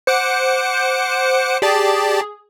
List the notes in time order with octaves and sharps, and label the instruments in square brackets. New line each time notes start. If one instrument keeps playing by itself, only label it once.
[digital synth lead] C5 [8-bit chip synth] F#5 D6 C#7
[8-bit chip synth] G4 D5 A5 [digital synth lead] G#4